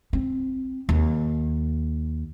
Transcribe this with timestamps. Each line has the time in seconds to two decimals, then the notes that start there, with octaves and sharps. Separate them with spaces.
0.13 C4
0.89 D#2